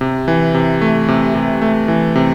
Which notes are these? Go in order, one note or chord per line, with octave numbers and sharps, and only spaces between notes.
C3
E3
C3
A3
C3
C3
A3
E3
C3